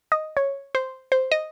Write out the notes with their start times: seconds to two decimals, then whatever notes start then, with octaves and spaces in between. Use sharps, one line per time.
0.12 D#5
0.37 C#5
0.75 C5
1.12 C5
1.32 D#5